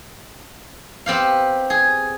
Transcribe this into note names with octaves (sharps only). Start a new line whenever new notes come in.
B3 C4 G4 F5
G#4